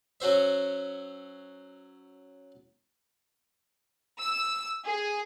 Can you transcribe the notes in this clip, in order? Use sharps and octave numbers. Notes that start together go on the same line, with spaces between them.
F#3 C#4 F#4 C5 E5
E6
G#4